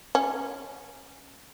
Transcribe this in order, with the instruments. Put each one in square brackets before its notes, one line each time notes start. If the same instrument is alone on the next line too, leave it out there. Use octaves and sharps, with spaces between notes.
[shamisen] C#4